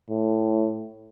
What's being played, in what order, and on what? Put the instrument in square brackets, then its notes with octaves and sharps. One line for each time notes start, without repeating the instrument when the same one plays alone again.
[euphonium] A2